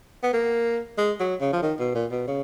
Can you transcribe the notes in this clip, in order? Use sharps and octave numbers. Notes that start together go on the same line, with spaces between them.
B3
A#3
G#3
F#3
C#3
F3
D#3
B2
A#2
B2
C#3